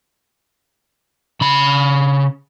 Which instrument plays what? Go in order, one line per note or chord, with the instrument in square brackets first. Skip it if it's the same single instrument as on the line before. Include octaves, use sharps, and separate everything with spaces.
[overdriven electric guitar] C#3 B5